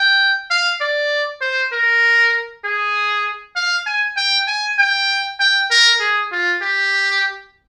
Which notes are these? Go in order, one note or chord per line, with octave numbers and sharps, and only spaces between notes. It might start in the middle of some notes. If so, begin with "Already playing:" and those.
Already playing: G5
F5
D5
C5
A#4
G#4
F5
G#5
G5
G#5
G5
G5
A#4
G#4
F4
G4